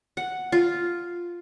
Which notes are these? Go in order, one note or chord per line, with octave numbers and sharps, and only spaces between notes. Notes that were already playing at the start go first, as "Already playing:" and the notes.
F#5
F4